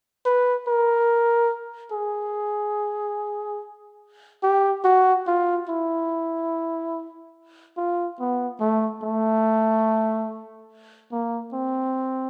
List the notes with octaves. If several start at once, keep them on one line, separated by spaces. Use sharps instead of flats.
B4
A#4
G#4
G4
F#4
F4
E4
F4
B3
A3
A3
A#3
C4